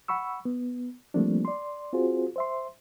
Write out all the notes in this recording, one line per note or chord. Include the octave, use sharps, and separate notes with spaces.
F#5 B5 C#6 E6
B3
F3 G3 A3 A#3 C4 D4
D5 C6
C4 F4 F#4 G#4 C5
C5 E5 C6